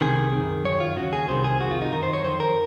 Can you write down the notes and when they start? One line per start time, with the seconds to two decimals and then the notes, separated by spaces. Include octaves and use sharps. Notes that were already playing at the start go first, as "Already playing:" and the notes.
0.01 C2 C3 D#3 G#4
0.33 F#2 D#3
0.65 F#2 D#3 C#5
0.80 F4
0.96 D#2 C#3 F#4
1.13 G#4
1.28 C2 C3 D#3 C5
1.44 G#4
1.60 F2 C3 D#3 F#4
1.71 F4
1.82 D#4
1.92 F#2 D#3 A#4
2.03 C5
2.13 C#5
2.24 F2 D#3 C5
2.40 A#4